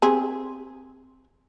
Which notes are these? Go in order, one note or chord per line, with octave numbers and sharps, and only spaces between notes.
C4 G4 G#4